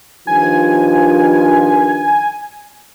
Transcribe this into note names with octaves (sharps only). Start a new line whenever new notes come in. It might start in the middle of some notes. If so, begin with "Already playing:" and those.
G2 D#3 F3 G#5